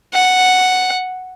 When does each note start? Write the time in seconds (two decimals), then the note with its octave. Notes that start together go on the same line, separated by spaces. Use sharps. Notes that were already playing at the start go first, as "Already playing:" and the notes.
0.13 F#5